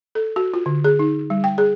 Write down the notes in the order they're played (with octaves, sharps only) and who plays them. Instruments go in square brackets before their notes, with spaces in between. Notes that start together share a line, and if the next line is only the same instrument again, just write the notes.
[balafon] A4
F#4
F4
D3
G#4
D#4
G3
G5
G#4